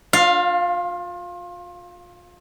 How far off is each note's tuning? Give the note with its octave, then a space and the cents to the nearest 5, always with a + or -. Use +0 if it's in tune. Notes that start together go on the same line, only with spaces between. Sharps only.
F4 +30 F5 +0